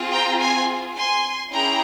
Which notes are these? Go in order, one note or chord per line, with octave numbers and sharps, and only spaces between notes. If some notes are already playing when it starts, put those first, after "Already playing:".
Already playing: C4 F4 G#4
G5 A#5
G#5 C6
G#5 C6
A#3 C#4 E4 G#4 G5 A#5